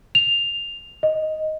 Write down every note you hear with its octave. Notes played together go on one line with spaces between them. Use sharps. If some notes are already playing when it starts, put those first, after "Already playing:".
F7
D#5